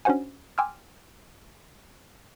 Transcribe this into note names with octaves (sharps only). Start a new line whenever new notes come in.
C#4 D4 F#4 C5 F#5 G#5
G5 G#5 C6 D6 E6 F6